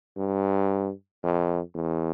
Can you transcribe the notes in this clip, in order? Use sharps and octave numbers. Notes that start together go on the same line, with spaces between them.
G2
F2
E2